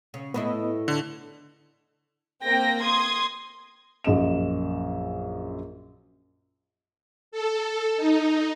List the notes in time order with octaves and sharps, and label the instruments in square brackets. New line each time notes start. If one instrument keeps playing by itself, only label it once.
[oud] C#3
[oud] A2 A3 E4 [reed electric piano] B3 B4 D#5
[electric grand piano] D3
[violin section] A#3 C4 G5 A#6
C6 D#6 G#6
[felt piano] A#1 F#2 D#5 E7
[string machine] A4
D#4